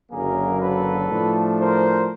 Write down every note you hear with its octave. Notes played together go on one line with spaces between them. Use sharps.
F#1 F#2 D3 F#3 A#3 G#4 A#4
A4 B4
A2 F3 A3 D4
A#4 C5